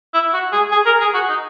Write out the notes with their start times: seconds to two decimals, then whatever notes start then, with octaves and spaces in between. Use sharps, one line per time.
0.14 E4
0.33 F#4
0.52 G#4
0.72 G#4
0.86 A#4
1.01 G#4
1.14 F#4
1.29 D#4